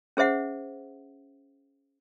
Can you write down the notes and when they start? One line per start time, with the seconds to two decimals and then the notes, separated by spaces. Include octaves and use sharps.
0.17 C#4 G#4 C5 E5 F#5